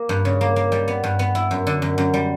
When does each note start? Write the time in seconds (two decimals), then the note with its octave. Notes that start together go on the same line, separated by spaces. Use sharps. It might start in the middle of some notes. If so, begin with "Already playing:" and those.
Already playing: A#3
0.09 G2
0.25 C#3
0.41 A#3
0.56 A#3
0.72 G3
0.88 B3
1.04 G2
1.19 B3
1.35 E4
1.51 F#2
1.67 D3
1.82 F#2
1.98 F#2
2.14 G3